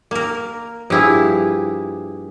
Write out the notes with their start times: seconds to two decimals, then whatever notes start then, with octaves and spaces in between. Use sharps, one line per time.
0.11 A#3 A#4
0.90 G2 F3 E4 G4 G#4